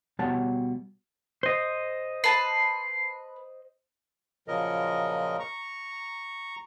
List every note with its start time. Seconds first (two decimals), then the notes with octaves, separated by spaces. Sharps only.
0.19 B2 G3 C#5 F#5 A5
1.43 C5 D#5
2.24 B4 A5 C7
4.48 A#2 C#3 F3 F#3 A#4 D#5
5.39 A#5 C#6